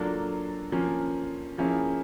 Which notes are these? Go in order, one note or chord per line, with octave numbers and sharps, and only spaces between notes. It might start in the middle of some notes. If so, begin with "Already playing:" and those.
Already playing: F#3 A#3 D4 F4 A4
F3 A#3 C#4
F3 A#3 C#4 E4 G#4